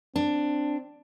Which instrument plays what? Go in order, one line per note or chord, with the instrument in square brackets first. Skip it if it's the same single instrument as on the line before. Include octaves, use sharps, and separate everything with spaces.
[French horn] C4 [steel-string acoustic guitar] D4